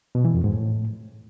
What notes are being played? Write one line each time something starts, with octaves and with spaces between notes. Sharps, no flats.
B2
E3
F2
G#2
A2